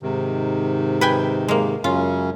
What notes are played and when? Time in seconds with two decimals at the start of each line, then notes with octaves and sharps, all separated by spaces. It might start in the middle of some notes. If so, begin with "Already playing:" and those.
0.03 G#2 C3 D#3
1.01 B4 G5 G#5
1.48 G#3 A#3
1.84 F#2 C#3 C#4 F4